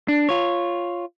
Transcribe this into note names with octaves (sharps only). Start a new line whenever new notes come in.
D4
F4 C#5